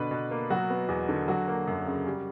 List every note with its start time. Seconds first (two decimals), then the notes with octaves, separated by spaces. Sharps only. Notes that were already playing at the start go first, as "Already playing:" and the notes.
Already playing: B2 D3 D4 B4
0.11 B2
0.31 A#3
0.50 F#3 F#4
0.70 B3
0.89 E2
1.09 D3
1.28 F#3 F#4
1.48 A#3
1.67 F#2
1.87 C#3
2.07 G3